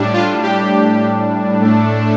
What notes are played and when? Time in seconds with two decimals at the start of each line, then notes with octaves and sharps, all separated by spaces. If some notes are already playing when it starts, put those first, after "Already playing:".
Already playing: A2 G3 D4
0.14 F4
0.43 G4
1.60 A2 A3 D4